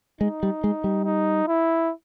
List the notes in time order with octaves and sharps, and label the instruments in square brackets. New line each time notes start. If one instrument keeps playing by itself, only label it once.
[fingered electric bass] G#3 [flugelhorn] D#4
[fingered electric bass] G3
G#3
G3
[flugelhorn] D#4
E4